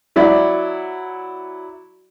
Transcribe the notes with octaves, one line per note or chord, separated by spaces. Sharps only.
F#3 E4 D5